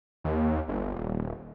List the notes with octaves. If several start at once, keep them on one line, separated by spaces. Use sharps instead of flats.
D#2
G1
D#1